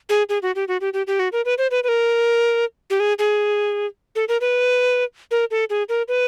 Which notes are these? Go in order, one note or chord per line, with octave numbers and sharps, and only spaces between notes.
G#4
G#4
F#4
G4
F#4
G4
G4
G4
F#4
A#4
B4
C5
B4
B4
A#4
G4
G#4
G#4
A4
A#4
B4
A#4
A4
G#4
A#4
B4